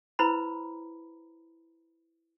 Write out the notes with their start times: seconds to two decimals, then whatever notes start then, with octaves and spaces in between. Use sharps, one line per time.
0.19 E4 B4 C5 A#5 B5